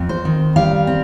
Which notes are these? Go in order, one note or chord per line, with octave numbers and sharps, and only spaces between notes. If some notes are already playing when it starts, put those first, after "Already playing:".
Already playing: F2 C4
C5
D#3
G3 F5
C4